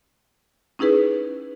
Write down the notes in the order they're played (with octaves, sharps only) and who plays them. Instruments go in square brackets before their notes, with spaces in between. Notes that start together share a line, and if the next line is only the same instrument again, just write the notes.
[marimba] C#4 D#4 E4 G#4 B4